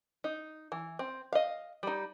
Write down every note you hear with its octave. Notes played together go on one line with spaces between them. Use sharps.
D#4
E3
C4
D#5 F5
G3 D#4